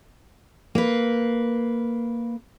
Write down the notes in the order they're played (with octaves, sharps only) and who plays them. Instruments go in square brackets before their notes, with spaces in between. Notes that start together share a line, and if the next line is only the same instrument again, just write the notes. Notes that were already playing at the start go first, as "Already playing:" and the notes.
[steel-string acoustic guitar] A#3 B4